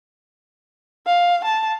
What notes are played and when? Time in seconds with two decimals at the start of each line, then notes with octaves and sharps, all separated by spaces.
1.06 F5
1.44 A5